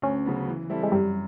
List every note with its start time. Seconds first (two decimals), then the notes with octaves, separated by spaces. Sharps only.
0.02 D2 C#4
0.25 C#3 F#3 B3
0.48 E3
0.70 G3 C4 E4 A4
0.83 G#3
0.92 F#2 G3